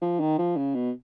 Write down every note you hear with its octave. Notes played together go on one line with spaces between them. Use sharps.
F3
D#3
F3
C#3
B2